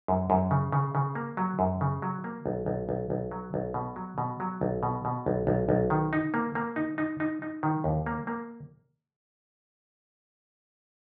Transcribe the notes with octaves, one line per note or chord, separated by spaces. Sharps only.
F#2
F#2
C#3
C#3
C#3
A#3
F#3
F#2
C#3
F#3
A#3
B1
B1
B1
B1
F#3
B1
B2
F#3
B2
F#3
B1
B2
B2
B1
B1
B1
D#3
D#4
A#3
A#3
D#4
D#4
D#4
D#4
D#3
D#2
A#3
A#3